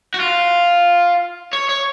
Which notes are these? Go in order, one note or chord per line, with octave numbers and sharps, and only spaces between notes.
F#4
F4
C#5
C#5